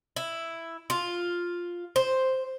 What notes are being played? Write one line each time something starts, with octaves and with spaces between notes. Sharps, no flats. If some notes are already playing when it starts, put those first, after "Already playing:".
E4
F4
C5